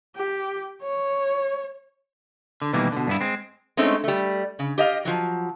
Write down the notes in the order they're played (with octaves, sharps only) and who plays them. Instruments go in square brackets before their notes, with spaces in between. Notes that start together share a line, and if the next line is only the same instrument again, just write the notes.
[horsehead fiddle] G4
C#5
[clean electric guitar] D3
B2 D#3 E3 G3 A#3
B2 D3
G2 B3 E4
G#3 C4
[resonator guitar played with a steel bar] G#3 A3 C4 C#4 D#4
G3 A3
C#3
G4 D#5 F5
F3 F#3